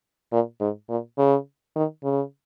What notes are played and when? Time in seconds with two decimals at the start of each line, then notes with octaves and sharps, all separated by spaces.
0.32 A#2
0.61 G#2
0.89 A#2
1.18 C#3
1.76 D#3
2.04 C#3